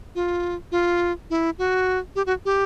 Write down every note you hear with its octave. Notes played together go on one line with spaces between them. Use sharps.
F4
F4
E4
F#4
G4
F#4
G4